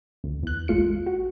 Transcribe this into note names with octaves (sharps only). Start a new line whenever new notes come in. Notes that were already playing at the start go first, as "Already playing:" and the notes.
D2
E2 F#6
A1 G#3 F4 C#7
F#4